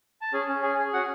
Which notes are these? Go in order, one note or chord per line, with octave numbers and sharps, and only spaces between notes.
A5
C#4 G#4 G#5
C#4
G#4 G#5
G#4
C#4 F#4 F#5